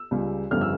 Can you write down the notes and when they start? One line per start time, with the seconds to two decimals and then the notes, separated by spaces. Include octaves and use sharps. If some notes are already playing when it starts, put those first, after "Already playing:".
Already playing: E6
0.11 C#2 C#3 G3
0.51 G1 F2 C#3 G3 F6
0.61 E6